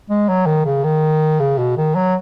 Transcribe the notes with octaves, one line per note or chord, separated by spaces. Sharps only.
G#3
F#3
D#3
C#3
D#3
C#3
B2
D#3
F#3